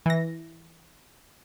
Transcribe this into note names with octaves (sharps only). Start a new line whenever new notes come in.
E3 A#6